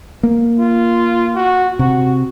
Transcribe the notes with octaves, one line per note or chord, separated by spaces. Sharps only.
A#3
F4
F#4
C3 F#4